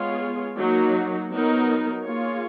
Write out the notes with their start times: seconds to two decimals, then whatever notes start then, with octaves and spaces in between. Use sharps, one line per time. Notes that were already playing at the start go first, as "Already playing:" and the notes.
Already playing: G#3 B3 F4 G#4 C#5
0.57 F#3 A#3 D#4 F#4
1.30 F#3 B3 D#4 A#4
2.04 A#3 F4 G#4 C#5